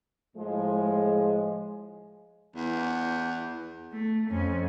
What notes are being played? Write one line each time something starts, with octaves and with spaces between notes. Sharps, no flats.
A2 F3 G#3
E2
A3
F2 C#4